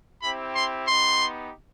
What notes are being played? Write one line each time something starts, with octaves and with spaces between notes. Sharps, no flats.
C4 E4 G4 B5
C6
B3 D#4 G4 C6